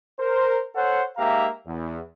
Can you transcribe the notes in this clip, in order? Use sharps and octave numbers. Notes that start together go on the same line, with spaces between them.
A#4 C5
A4 C5 C#5 F#5
G#2 A#3 G4 E5 F5 A#5
E2